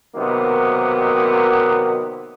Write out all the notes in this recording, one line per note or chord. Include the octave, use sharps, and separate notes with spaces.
C3 D#3 F#3 A#3 B3